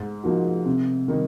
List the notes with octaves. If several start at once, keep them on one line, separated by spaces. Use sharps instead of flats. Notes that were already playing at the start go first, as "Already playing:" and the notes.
Already playing: G#2
F3 A#3 D#4 F#4
C3
D#3 G3 A#3 D#4